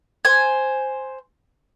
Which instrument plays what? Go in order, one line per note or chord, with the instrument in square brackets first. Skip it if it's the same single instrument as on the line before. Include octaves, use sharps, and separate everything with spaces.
[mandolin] C5 G#5